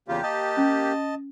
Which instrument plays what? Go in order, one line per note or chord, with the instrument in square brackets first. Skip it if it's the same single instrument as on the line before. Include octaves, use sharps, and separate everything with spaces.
[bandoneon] E2 C#3 F4 [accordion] A#3 G4
[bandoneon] D#5 A5
[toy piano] C#4